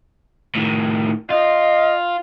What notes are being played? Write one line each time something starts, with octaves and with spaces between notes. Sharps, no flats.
A2 D#3
F4 D#5